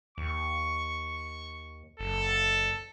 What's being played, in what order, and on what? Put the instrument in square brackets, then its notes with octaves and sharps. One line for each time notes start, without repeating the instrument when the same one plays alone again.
[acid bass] D#2 [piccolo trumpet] C#6
[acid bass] F#1 [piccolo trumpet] A4